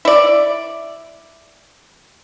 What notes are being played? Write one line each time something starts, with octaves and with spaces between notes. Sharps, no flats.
E4 D5